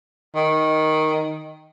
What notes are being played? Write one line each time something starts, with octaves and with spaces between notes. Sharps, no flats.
D#3